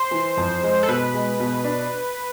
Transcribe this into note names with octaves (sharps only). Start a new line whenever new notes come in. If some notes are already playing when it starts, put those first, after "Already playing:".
Already playing: C5
E3
F2
G#3
A4
B2 B4
G#3
B2
D4